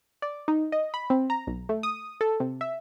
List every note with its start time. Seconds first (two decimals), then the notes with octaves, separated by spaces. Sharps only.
0.22 D5
0.48 D#4
0.72 D#5
0.94 B5
1.10 C4
1.30 A#5
1.47 B1
1.69 A3
1.83 D#6
2.21 A4
2.40 C3
2.61 E5